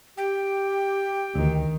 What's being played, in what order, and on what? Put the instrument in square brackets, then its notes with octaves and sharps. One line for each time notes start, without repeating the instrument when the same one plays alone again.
[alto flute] G4 [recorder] G5
[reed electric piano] D2 [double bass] D#3